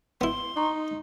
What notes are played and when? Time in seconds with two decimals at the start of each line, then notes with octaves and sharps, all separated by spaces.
0.21 B3 E4 C6
0.56 D#4 A#5 C#6